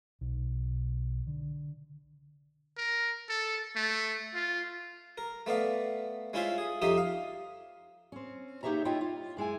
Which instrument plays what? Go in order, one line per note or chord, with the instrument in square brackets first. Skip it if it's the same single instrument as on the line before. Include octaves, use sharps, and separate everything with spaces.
[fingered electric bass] B1
D3
[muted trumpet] A#4
A4
A3
F4
[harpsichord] A#4
A3 B3 D5 F5
G#3 C#4 E4 F4 C5 E5
G#4
F2 D#4 G4 C5 E5 D#6
F5
[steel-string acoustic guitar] C4 C#4
A#3 D#4 G4 C#5 E5 A#5
E4 F4 C#5 D#5 E5 G5
F4
F#2 G#3 E4 G#5